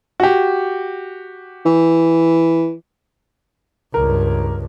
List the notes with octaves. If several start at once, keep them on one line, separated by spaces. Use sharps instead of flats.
F#4 G4
E3
C#2 G2 A#4